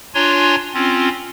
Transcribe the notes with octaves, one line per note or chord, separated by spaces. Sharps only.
D4 F4 C#5 G#5 A#5 C6
C4 C#4 F4